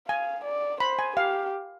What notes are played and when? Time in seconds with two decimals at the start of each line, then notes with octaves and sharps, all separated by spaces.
0.08 F5 G#5
0.45 D5
0.80 C5 B5
0.99 G#5
1.17 G4 F5